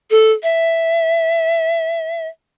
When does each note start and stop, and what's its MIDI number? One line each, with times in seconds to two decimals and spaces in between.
0.10 0.32 69
0.43 2.27 76